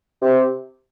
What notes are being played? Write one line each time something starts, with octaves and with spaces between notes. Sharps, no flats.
C3